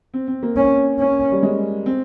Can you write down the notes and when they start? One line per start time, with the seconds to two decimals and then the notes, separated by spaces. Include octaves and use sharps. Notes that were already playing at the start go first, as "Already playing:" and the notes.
0.14 C4
0.28 C4
0.43 A#3
0.56 C#4
0.99 C#4
1.32 G3
1.43 G#3
1.86 C4